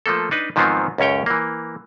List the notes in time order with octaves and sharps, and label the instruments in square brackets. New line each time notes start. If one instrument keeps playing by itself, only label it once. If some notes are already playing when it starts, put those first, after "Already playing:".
[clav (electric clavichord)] F3 A3 A#3 A4
D4 D#4 B4
G#2 D#3 F3 F#3 B3 C4
C#2 F#2 C#4 C#5 G5
E3 A#3